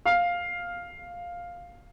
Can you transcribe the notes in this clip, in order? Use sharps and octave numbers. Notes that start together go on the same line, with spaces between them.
F5